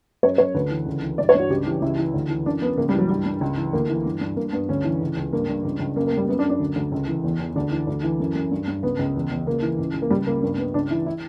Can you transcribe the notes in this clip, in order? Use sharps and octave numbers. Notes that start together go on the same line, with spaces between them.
F#2 C#5
F#2 C#5
D2 B4
E3
C#2
E3
G2 D5
C#5
G2 F#4
C#2 G4
E3
C#2 E4
E3
D2
E3
F#2 D4
F#2 B3
C#2 A#3
G3
E3 F#3
G2 G3
G2
C#2
E3
D2 A#3
E3
G2
G2
G2 A#3
G2 B3
D2 C#4
E3
C#2
C#2
G2 A#3
G2
C#2
C#2
F#2 A#3
A#3
F#2 G3
F#2 B3
D4
F#2
D4
D2
D2
C#2
E3
E2
E2
D2 D4
E3
D2
E3
F#2
F#2
G2
G2
C#2 B3
C#2
E2
E2
C#2 A#3
E3
C#2
C#2
A#3
C#2 G3
C#2 A#3
G2 A#3
G2 B3
C#2 D4
E3 E4
E4